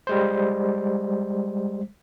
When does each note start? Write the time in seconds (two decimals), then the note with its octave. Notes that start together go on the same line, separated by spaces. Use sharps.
0.07 G3 G#3 C5